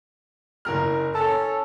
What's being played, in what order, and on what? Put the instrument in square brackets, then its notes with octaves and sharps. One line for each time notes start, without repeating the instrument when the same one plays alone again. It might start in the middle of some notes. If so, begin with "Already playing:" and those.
[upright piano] F#1 A#4 F6
[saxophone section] C#4 A4 [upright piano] A5